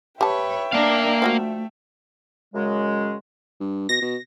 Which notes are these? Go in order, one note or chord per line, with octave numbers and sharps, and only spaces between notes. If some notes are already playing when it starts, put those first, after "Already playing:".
G4 B4 C#5 E5 G5 A5
A#3 D4 F5
F3 A3 F4 F#4
F#2 C#3 G#3
G2
B2 A#6
B2